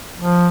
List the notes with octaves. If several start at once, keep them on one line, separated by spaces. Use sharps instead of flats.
F3